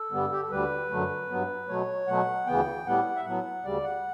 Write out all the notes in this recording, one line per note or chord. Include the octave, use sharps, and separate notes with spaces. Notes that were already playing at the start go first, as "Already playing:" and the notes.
Already playing: A4
G2 D3 G3 B3
G4
A4
D2 D3 G3 B4
F#2 D3 F#3 A3
G2 F#3 B3
B2 F#3 A3 C#5
B2 F#3 A3 F#5
D2 C#3 E3 B3 G5
A2 G3 B3 F#5
E5
A2 F#3 B3 F#5
D2 C#3 G3 D5
F#5